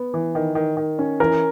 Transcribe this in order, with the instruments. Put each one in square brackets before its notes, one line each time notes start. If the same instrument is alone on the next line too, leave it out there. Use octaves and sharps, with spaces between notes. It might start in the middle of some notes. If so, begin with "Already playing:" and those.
Already playing: [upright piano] B3
E3
D#3
D#3
D#3
C#4
[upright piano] E3 [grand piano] A#4